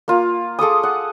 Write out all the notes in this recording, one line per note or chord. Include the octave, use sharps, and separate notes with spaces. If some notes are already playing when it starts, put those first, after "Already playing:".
A#3 F4
G#4 A4 D6 D#6
F#5